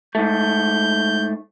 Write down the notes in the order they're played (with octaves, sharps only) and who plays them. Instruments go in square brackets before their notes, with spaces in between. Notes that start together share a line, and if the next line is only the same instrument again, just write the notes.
[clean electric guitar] G#2 A3 [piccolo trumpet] G6